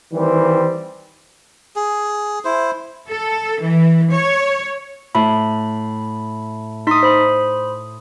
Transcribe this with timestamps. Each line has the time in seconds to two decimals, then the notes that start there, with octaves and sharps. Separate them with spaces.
0.12 D#3 E3 G3 C4
1.76 G#4
2.45 E4 C5
3.09 A4
3.61 E3
4.11 C#5
5.15 A2 B5
6.87 D#4 C6 D#6 B6
7.03 C5 B5